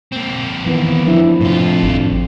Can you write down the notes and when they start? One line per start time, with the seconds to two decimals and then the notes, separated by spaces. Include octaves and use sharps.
0.12 A#3 C4
0.66 D#3 E3 B3
1.06 F3 D4 E4
1.41 F2 A2 F4
1.83 G#1 D4